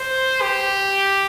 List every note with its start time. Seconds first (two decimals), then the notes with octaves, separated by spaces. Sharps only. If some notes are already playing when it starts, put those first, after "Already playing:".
Already playing: C5
0.42 G4